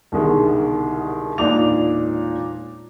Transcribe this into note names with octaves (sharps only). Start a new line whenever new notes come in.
C2 B2 D3 D#3 G#3
E1 A#2 D4 D#4 D6 F7